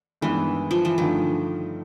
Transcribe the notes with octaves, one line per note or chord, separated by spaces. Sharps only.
G2 D#3 E3 G#3 B3 E4
F3
E3
G2 D3 D#3 F3 A3